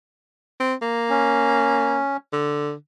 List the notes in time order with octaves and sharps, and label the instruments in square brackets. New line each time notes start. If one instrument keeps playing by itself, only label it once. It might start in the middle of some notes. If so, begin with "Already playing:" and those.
[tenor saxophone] C4
A#3
[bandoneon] C#4
[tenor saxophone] D3